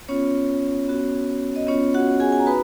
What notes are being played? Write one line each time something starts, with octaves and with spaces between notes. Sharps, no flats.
B3 C#4 F4 C#5
B3 F#4
D#5
B3 C#4 F4 C#5
F#4 F#5
G#4 G#5
G#5
A#5
D#4 F#4 B4 B5